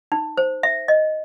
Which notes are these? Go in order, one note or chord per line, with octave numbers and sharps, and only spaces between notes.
D#4
C5
E5
D#5